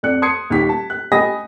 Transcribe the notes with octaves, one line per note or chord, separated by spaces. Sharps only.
F2 D5 F#6 C#7
A5 C6 D#6 G#6 C7 C#7
D#1 D#2 D#4 G4 B6
A5
F#6
D#5 G5 G#5 B5 D#6 A#6